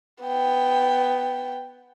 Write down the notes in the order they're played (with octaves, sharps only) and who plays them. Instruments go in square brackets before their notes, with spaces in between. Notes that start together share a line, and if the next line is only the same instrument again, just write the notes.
[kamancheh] B3 G5